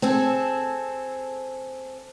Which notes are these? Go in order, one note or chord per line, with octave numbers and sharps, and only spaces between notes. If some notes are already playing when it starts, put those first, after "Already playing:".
C4 G#4 A4